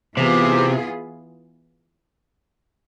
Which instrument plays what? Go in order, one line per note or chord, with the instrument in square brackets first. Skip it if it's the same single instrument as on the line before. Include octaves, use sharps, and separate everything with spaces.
[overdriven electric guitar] C3 [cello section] E3 B3 F4 G#4